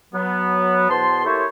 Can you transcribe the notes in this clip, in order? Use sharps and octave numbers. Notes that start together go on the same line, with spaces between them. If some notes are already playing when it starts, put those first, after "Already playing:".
F#3 B3
E2 B2 C5 A5 C6
A#3 E4 G4 A4 C5 C#5